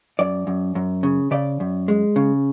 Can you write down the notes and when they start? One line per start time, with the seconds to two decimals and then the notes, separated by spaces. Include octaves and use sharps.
0.19 F#2 D5
0.47 F#2
0.75 F#2
1.03 C#3
1.31 C#3 D5
1.60 F#2
1.88 G#3
2.16 C#3